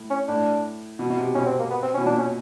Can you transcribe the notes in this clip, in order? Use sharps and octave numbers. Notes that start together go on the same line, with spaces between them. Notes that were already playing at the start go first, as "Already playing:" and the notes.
Already playing: A2
C#4
A2 D4
B2
B2
C3
B2 C#4
C4
A#3
B3
C4
C#4
B2
A#2 D4
C#4